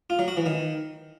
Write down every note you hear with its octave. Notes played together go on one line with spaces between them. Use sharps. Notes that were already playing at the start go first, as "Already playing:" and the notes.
F4
F#3
F#4
E3
D#3